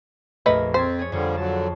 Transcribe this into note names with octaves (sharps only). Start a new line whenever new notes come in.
A#1 F2 A3 A#4 B4 D#5
F2 C4 C5 G#6 A6 B6
G#4 C#5
F2 D3 F3 G3 F4 C#5
D3 F#3 A5